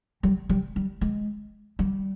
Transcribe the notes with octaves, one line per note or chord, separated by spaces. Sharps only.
G3
G3
G3
G#3
G3